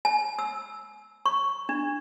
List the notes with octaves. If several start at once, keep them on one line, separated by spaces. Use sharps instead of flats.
G#5
E6
C#6
D4